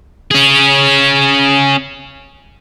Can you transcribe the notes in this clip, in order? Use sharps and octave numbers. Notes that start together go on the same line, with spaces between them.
C#4 G#4